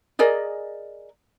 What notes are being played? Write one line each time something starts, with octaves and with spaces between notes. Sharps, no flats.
G#4 A#4 D5 D#5